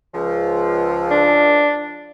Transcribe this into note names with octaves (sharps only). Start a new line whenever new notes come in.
C#2 F3
D4